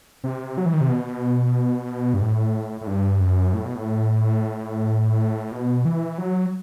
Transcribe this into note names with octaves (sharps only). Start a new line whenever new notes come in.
C3
F#3
E3
D#3
C3
B2
G2
A2
A2
G2
F#2
A2
B2
A2
B2
E3
F#3